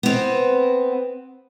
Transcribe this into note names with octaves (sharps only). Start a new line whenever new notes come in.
B3 C4